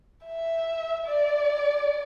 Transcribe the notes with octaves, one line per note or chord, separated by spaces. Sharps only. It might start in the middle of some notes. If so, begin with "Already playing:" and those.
E5
D5